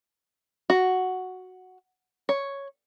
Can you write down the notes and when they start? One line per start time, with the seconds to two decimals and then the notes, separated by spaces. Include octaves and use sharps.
0.70 F#4
2.29 C#5